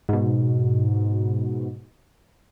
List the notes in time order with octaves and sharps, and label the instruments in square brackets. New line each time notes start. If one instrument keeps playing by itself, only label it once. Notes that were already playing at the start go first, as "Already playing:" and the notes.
[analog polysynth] G#2 B2